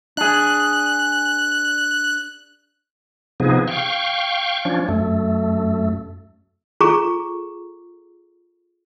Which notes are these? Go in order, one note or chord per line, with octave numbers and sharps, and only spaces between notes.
D4 G#4 F#6
C3 F3 B3 D#4 G#4
F5 G5 C#6
F3 C#4 D4
F#2 A3
F4 G#4 A4 A#5 C#6 D6